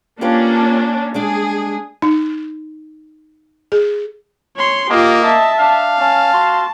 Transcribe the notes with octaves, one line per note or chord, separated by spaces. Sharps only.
A#3 C#4 D4 F4 G4 B4
G3 G#3 D4 G#4
D#4
G#4
C#5 C6
A#3 F4 G4 D#5
E5 A5
D4 F5
C#4 A5
F#4 C6